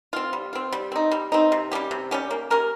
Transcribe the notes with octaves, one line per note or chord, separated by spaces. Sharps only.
C4 F4
G3
C4 F4
G3
C4 D#4
G3
C4 D#4
C3
G3 C#4 G4
C3
G3 C#4 G4
A#3
C#4 G4 A#4